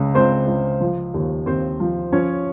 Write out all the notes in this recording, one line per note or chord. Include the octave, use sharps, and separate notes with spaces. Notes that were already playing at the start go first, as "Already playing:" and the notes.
Already playing: C#2 C#3
C#2 C4 C5
C#2
F3
D#2
D#2 C4 C5
F3
F3 C#4 C#5